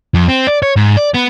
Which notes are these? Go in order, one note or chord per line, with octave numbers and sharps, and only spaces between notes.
F2
C4
D5
C#5
G#2
D5
B3